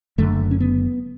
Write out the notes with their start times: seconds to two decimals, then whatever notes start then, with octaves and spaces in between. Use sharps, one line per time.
0.18 F#1 F#2 D3 A3
0.51 C#4
0.60 B3